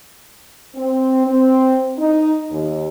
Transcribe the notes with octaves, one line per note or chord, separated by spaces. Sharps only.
C4
C4
D#4
D#2